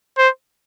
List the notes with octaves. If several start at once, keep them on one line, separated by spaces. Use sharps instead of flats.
C5